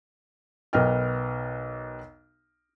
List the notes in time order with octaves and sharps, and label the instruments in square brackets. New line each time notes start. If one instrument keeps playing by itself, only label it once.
[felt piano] B1 B3 A#4 D#5 G5 F6